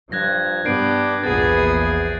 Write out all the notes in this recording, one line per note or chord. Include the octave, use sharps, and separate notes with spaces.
G2 F3 F#6 G#6 A#6
G2 B3 D4 G4 G6 C7 D7
A#1 E2 A#2 B3 G#4 A6